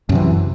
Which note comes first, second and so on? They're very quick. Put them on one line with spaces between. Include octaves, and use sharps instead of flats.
F#2 C3 E3